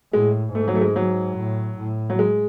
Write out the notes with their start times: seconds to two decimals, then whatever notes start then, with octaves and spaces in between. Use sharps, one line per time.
0.13 A2 G#3
0.54 G#2 A3
0.68 F#3
0.75 A3
0.81 G#3
0.96 F#3
1.37 A2
1.78 A2
2.10 F#3
2.19 G#3